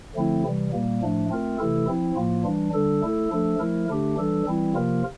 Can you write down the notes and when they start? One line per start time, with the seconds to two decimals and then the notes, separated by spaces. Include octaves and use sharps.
0.15 D3 F3 A3 C4 E4
0.44 C3 E3 G3
0.73 A#2 G3 A#3
1.02 A2 F3 A3 D4
1.30 A3 C4 F4 A#4
1.58 C3 E3 A3 E4 A4
1.88 F3 C4 E4
2.16 A2 F3 A#3 F4
2.44 E3 G3 D4
2.74 D3 G3 D4 A4
3.03 A3 E4 A4
3.32 F3 A3 D4 A4
3.59 F3 A3 E4 A#4
3.88 D3 A3 D4 G4
4.17 E3 G3 D4 A4
4.46 E3 G3 C4 E4
4.74 C3 F3 A#3 F4 A#4